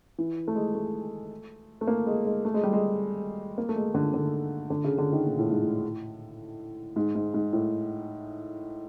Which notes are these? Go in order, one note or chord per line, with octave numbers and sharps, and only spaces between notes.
E3
A3
G#3
A3
A3
A#3
G#3
G#3
A3
G#3
G3
G#3
A#3
A3
G#3
D3
D3
D3
C#3
D3
D#3
A#2
A2
G#2
A2
G#2
G#2
G#2
A2